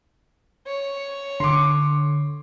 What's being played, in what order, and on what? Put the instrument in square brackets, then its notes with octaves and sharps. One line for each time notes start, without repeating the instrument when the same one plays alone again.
[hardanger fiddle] C#5
[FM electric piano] D3 [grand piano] C6 D6